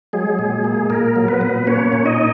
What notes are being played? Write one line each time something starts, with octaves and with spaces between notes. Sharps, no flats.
F#3 G#3 G#4
A#2
A#3
A#2 A#3 A#4
F#3
B3 B4
A#2
A#3 C#4 C#5
A#2
D#4 D#5